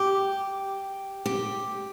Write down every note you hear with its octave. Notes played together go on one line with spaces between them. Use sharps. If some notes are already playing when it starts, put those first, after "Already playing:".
Already playing: G4
G4